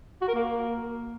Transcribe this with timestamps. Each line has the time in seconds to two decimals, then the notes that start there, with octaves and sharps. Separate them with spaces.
0.21 F#4
0.28 A#4
0.34 A#3